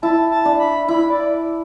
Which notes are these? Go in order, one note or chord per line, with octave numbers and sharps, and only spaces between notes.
E4 A5
A5
D4
B5
E4 B5
D5